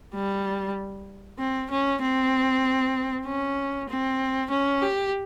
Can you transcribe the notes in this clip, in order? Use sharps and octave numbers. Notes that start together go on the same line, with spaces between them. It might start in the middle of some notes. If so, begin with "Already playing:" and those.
G3
C4
C#4
C4
C#4
C4
C#4
G4